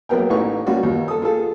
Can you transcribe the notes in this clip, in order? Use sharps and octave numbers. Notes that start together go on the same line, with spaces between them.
A#1 F#3 A#3 B3 A#4 G5
A1 A2 A#3 B3 D#4 C#6
G3 A#3 C#4 F4 F#4
D#2
A4 D#6
F4 G#4 A4